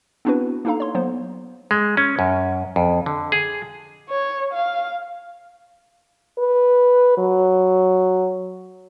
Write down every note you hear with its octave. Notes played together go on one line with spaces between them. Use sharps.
B3 C4 D4 E4 F#4 B4
A#3 D4 D#4 A4 F5 A#5
C#5 C6
F#3 A#3 B3 C5
G#3
C#4
F#2
F2
D3
G#4
C#5
F5
B4
F#3